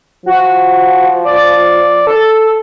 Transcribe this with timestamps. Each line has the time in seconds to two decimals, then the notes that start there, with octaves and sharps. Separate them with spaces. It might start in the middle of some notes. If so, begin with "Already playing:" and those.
0.26 F3 F#4
1.25 D5
2.07 A4